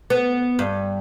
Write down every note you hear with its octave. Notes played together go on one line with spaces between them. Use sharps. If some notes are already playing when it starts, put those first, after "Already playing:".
B3
G2